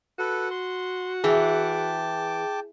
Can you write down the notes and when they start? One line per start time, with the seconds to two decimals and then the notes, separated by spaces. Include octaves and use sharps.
0.19 F#4 A4 B4
0.51 C6
1.24 E3 G#4 G5 A5 D6